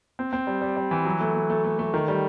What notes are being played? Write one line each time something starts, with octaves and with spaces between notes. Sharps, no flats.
C4
C4
G3
G3
G3
E3
F#3
A3
A3
A3
A3
A3
D#3
G3